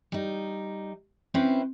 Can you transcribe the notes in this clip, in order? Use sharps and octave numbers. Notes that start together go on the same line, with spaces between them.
G3 D#4
C4 C#4 E4 B4 C5